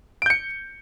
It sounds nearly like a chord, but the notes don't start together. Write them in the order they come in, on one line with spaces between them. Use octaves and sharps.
D7 G6 C#7